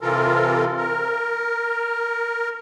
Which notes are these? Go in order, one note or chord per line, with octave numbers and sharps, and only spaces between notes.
C3 E3 F4 A4 A#4
A#4